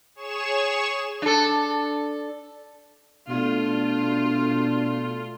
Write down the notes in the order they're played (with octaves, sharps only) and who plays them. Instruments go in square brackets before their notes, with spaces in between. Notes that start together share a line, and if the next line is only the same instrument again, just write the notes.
[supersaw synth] G#4 C#5 C#6 E7
[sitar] D4 A4
[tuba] B2 [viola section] A3 F4 [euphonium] D4